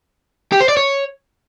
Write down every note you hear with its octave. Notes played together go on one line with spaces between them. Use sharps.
G4
C5
D5
C#5